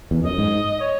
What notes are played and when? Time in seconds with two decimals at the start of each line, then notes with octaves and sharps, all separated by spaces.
0.11 E2
0.24 F#2 D#5
0.38 G#2
0.80 C#5